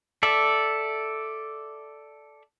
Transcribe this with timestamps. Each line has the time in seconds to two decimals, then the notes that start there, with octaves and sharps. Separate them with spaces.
0.23 A4 D5 E5